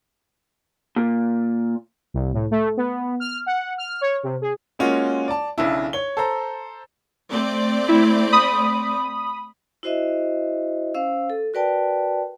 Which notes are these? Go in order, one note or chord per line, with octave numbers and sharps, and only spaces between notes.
A#2
C2
A2
A3
B3
F6
F#5
F6
C#5
C3
G#4
G#3 A#3 C#4 F4 F#4
D5 A5
B1 C#3 D4 E4
C#5 G7
A4 C5 A#5
A3 C4 D5
E4
B5 D#6
E4 F#4 C5 D#5 E5
C#4 C5 F5 E6
A4
F#4 A#4 B4 D5 G5 A5